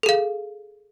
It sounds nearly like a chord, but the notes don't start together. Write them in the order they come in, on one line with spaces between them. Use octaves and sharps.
A4 G#4 F5